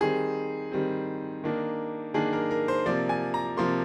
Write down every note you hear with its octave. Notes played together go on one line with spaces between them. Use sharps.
D#3 G3 C4 G#4
D#3 G3 C4
D#3 A#3 D4
D#3 A#3 D4 G#4
A#4
A#4
C5
C3 F3 A#3 D5
G#5
A#5
C3 F3 A#3 C6